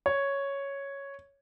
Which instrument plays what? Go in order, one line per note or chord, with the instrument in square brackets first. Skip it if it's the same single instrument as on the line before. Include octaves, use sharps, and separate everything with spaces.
[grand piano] C#5